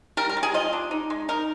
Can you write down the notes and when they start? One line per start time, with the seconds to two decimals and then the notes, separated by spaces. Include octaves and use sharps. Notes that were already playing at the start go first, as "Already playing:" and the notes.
0.17 G3 A#4
0.29 A#4
0.37 G3
0.43 G#4
0.54 F4 D#5
0.73 D4
0.91 D#4
1.10 G#3
1.28 D#4 A#4